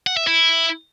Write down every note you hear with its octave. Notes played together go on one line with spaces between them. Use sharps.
F#5
E5
E4